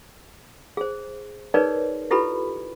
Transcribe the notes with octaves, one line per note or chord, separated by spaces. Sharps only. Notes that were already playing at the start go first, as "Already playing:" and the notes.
G#4 C5
D#4 G#4 A#4 B4 C#5 D5
E4 F4 G4 A4 B4 B5